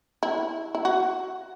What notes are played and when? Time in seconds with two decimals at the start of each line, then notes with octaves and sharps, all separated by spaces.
0.23 E4
0.75 E4
0.85 F#4